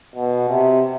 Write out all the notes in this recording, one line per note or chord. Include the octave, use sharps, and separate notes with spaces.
B2
C3